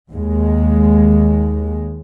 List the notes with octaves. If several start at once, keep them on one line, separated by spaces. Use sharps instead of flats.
D#2 G#3